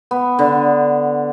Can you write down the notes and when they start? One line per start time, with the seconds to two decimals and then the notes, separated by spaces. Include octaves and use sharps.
0.11 B3
0.39 D3